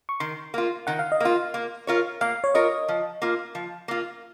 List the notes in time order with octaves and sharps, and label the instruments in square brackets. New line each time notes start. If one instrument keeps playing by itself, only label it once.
[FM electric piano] C#6
[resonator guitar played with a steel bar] D#3 [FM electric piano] C6
[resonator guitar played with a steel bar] A#3 F4
[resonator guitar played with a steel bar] D#3 [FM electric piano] F#5
[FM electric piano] F5
D#5
[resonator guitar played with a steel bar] A#3 F4 [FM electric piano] F5
[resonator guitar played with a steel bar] A#3
F4 A#4 C#5
[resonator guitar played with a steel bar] A#3 [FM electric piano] F5
[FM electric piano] C#5
[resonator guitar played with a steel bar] F4 A#4 C#5 [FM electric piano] D#5
[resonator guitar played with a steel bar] F3
A#3 F4
F3
A#3 F4